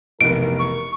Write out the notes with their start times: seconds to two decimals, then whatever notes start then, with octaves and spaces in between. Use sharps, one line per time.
0.21 F1 B1 E3 A#4 D7
0.59 C#6